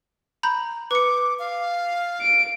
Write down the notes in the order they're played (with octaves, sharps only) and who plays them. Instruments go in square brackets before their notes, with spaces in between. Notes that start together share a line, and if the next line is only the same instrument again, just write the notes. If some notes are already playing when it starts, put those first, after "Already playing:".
[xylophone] A#5 B5 G6
[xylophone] B4 C#7 [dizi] D6
[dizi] F5
[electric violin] D7